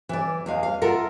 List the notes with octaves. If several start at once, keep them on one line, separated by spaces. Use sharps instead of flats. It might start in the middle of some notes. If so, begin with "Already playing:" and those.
E3 D5
E2 G#3 F5
F5
F4 A4 A#4 E5 F#5